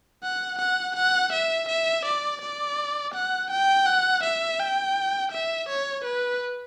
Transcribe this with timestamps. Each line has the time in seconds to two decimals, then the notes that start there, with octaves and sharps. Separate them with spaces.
0.23 F#5
0.59 F#5
0.96 F#5
1.32 E5
1.69 E5
2.05 D5
2.42 D5
3.14 F#5
3.51 G5
3.86 F#5
4.24 E5
4.59 G5
5.32 E5
5.69 C#5
6.04 B4